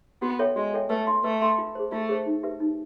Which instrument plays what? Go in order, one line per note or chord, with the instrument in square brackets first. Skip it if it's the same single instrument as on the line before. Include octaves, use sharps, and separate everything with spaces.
[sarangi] B3 [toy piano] F#4
[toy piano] A4 C#5 E5 G5
[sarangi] G#3 [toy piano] F#4
[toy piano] A4 C#5 E5 G5
[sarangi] A3 [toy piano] B4
[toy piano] E5 G#5 C6
[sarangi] A3 [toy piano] B4
[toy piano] E5 G#5 C6
F4
G#4 C5
[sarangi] A3 [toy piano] F4
[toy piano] G#4 C5
D#4
G4 B4 E5
D#4